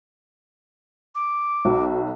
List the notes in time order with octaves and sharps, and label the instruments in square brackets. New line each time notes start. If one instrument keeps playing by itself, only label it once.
[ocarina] D6
[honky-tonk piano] B1 [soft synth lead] F#4